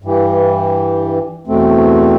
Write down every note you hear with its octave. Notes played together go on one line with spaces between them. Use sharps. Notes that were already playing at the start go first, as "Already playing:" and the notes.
G2 E3 G3
E2 B2 A3 C4